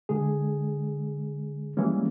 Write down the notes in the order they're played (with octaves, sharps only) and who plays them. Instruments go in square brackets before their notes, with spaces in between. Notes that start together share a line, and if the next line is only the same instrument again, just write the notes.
[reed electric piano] D3 G#3 G#4
E3 G3 G#3 A#3 C#4